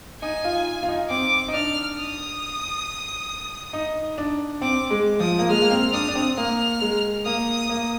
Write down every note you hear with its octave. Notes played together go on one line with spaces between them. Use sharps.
D#4 G#5
F4
F4
D#4
C4 D6
D#4
D4 F6
D#6
D#4
D4
C4 D6
G#3
F3 D#6
A#3
G#3 F6
A#3
C4
D4 D#6
D4
C4
A#3 F6
G#3
A#3 D#6
A#3